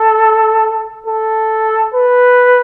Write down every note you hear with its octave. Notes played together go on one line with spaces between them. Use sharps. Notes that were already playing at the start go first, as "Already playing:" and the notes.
Already playing: A4
A4
B4